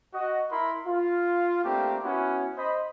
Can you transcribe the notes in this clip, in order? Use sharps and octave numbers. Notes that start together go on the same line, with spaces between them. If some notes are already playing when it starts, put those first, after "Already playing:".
F#4 D#5
E4 A#4 B5 C6
F4
A3 A#3 C4 D4 G4
B3 C#4 E4 F#4
C5 D#5 B5